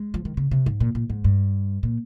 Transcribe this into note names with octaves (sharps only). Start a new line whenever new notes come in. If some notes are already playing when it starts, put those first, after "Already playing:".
Already playing: G#3
F3
D#3
C#3
C3
G#2
A#2
A#2
G#2
G2
A#2